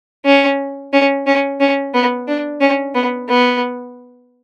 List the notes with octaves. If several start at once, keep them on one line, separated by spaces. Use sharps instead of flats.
C#4
C#4
C#4
C#4
B3
D4
C#4
B3
B3